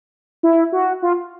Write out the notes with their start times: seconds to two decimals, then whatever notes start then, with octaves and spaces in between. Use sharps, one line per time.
0.43 E4
0.72 F#4
1.02 F4